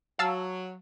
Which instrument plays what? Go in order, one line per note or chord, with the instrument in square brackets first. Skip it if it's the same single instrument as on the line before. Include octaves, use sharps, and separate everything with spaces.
[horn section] F#3 [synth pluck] F5 A5 E6